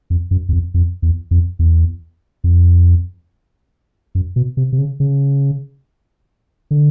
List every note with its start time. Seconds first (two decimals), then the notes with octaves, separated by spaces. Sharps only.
0.10 F2
0.31 F#2
0.49 E2
0.53 F2
0.74 F2
1.02 E2
1.31 F2
1.59 E2
2.44 F2
4.15 F#2
4.36 B2
4.57 C3
4.72 C3
4.78 C#3
5.00 C#3
6.71 D3